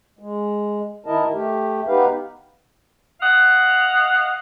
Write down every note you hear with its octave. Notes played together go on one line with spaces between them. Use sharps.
G#3
D#3 E4 A#4 D#5 A5
A3 G4
B3 D#4 G4 B4 F5
D#5 F5 F#5